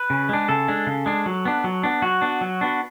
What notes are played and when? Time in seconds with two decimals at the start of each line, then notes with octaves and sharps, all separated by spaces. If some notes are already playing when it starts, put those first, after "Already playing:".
Already playing: B4
0.10 C#3
0.29 G#3 D4
0.49 C#3 A4
0.68 G#3 D4
0.87 C#3
1.06 G#3 D4
1.26 F#3
1.45 B3 D4
1.64 F#3
1.83 B3 D4
2.02 F#3 F#4
2.22 B3 D4
2.41 F#3
2.61 B3 D4